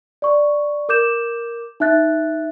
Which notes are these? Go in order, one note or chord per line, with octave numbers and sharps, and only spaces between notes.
D5 C#6
A#4 D6 G6 E7
D#4 E5 F#6 A6